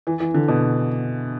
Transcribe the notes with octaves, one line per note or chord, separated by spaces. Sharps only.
E3
E3
D3
B2